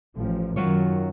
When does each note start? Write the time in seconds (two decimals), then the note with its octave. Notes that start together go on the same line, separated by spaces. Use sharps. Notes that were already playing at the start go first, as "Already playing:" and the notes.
0.14 A1 F3
0.56 F#2 D#3 F#3 F4 C#5